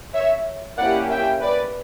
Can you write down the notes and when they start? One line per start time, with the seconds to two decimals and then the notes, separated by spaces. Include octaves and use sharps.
0.14 C#5 E5
0.78 A#3 C#4 E4 G4 D5 F#5
1.11 E5 G5
1.42 B4 D5